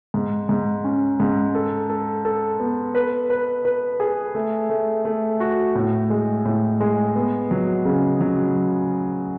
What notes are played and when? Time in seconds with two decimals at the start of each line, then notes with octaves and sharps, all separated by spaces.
0.14 G#2
0.49 G#2
0.84 C#4
1.20 G#2
1.55 A4
1.90 A4
2.25 A4
2.60 B3
2.95 B4
3.30 B4
3.65 B4
4.00 G#4
4.35 A3
4.70 A3
5.05 A3
5.40 F#4
5.75 A2
6.10 G#3
6.45 A2
6.80 G#3
7.15 B3
7.51 F#3
7.85 C#3
8.21 F#3